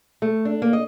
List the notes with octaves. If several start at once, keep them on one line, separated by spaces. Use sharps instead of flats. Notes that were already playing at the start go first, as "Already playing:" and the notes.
A3
D4
A#3
D#5